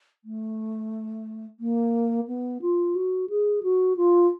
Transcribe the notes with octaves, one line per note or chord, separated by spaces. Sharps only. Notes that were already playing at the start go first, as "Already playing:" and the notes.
A3
A#3
B3
F4
F#4
G#4
F#4
F4